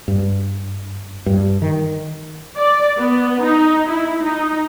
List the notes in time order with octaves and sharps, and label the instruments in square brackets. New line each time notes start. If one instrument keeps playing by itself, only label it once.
[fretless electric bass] G2
G2
D#3
[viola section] D5
B3
D#4
E4
D#4